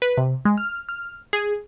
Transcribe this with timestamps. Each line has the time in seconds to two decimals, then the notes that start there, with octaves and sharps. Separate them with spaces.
0.02 B4
0.17 C3
0.45 G#3
0.58 F6
0.89 F6
1.33 G#4